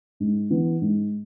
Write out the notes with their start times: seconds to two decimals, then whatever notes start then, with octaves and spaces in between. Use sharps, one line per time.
0.20 G#2
0.50 E3 B3
0.81 G#2